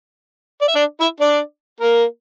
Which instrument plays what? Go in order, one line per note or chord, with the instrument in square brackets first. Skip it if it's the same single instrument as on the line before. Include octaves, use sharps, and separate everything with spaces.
[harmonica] D5
E5
D4 D5
E4 E5
D4 D5
A#3 A#4